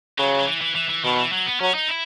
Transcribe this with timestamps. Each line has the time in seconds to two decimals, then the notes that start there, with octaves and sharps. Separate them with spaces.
0.18 C#3 F#3
0.39 F#3
0.47 E3
0.61 E3
0.75 E3
0.89 E3
1.04 B2 D#3
1.18 E3
1.32 F#3
1.46 B3
1.60 F#3 C#4
1.75 D#4
1.89 E4